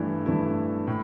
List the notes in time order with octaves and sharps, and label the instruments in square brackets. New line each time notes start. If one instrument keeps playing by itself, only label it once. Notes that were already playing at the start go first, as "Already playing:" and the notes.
Already playing: [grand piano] G2 E3 A3 E4
G2 E3 A3 E4
A2